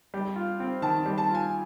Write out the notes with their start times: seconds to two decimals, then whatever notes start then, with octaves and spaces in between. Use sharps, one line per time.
0.14 G3
0.36 F4
0.60 C4
0.82 D#3 A5
1.06 G3
1.18 A5
1.29 F4
1.35 G#5